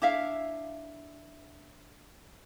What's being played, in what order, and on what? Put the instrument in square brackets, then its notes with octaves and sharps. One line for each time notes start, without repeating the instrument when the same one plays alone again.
[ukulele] D4 E4 E5 F5